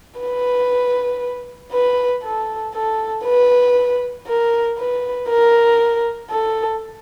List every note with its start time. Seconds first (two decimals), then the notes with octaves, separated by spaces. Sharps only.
0.20 B4
1.72 B4
2.24 A4
2.75 A4
3.25 B4
4.28 A#4
4.78 B4
5.29 A#4
6.30 A4